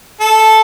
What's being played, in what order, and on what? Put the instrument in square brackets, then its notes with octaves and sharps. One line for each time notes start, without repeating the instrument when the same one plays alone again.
[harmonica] A4